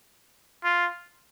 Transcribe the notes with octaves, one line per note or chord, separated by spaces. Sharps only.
F4